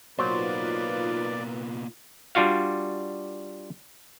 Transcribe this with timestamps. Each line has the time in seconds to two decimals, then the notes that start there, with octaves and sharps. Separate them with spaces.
0.19 B2 F#3 A#3 D#4 F4 B4 C5 D5
2.35 G3 D4 F4 F#4 F5